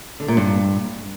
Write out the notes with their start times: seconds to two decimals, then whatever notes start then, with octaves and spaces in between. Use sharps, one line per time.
0.20 D3
0.28 A#2
0.37 G2